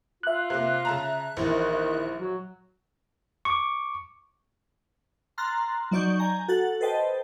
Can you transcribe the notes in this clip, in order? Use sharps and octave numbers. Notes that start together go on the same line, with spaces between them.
F4 E5 F#6
C3 A#3
C#3 A5 A#5
A#1 D#3 E3
F#3
C#6 D6
A#5 C6 F6 F#6 A6
F#3 D#4 D5 C#6 G6
G#5 A#5 G6
F#4 A4 F#5 A6
A4 B4 C5 D#5 G5 A5